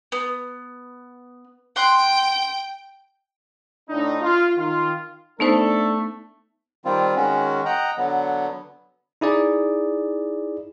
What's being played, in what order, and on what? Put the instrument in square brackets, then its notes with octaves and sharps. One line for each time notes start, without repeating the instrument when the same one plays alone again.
[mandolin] B3
[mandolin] F#5 C6 F#6 [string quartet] G5
[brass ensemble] A2 D4 D#4
F4
D#3 F4
[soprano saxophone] A3 [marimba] B3 D#4 C5 [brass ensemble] D4 A4
[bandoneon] D#3 G3 C4 F4
D#3 G#3 C#4 F#4
D#5 F#5 G5 A#5
D3 F#3 B3
[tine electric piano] D#4 E4 G#4 D5